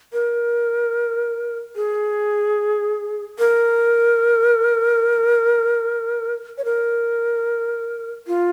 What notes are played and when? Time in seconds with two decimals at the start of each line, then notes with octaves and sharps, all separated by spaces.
0.13 A#4
1.76 G#4
3.39 A#4
6.58 C#5
6.65 A#4
8.27 F4